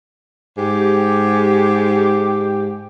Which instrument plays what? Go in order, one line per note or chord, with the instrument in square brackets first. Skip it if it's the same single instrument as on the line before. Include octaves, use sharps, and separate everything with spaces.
[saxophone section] G#2 G4